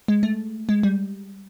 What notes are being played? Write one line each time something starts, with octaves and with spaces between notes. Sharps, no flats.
G#3
A3
G#3
G3